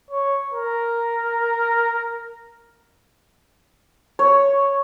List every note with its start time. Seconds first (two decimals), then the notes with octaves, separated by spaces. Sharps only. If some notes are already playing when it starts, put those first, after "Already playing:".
0.11 C#5
0.54 A#4
4.19 C#5